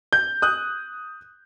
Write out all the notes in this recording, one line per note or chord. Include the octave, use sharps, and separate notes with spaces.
G6
D#6 F#6